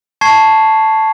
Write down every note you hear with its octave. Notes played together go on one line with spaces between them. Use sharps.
A5 C#6 G#6 C7